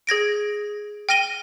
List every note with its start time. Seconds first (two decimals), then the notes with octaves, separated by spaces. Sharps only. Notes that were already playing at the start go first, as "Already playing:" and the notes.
0.07 G#4 G#6 A#6 D7
1.09 G5 F6 A#6 D#7 G7